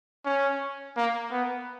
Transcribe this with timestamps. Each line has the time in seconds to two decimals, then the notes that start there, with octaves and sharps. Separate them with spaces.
0.25 C#4
0.97 A#3
1.32 B3